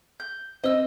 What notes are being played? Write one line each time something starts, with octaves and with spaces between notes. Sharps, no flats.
G6
C4 D#5 E6